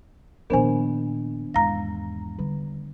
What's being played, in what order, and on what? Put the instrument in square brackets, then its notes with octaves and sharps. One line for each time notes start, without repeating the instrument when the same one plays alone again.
[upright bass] A#2 F3 [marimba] D#3 B3 D4 [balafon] A#4 C5 G#5
[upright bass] E2 G#2 [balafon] F5 A#5 [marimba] A#6
[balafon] D3 [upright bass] G3